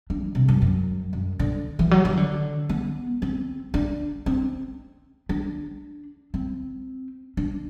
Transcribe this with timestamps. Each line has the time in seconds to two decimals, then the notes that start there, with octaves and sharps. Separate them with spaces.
0.10 D4
0.22 E3
0.35 C3
0.48 F#2
0.62 F#2
1.13 F#2
1.39 D3
1.79 E3
1.91 F#3
2.05 E3
2.17 D3
2.69 B3
3.22 C4
3.74 D4
4.26 C4
5.29 D4
6.34 C4
7.37 D4